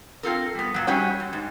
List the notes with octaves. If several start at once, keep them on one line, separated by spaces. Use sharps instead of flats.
C4 F4 A4 A#4
G3 B3
A#2 F#3
G#2 G3 C#4 F#4 C#5
F#2
G#2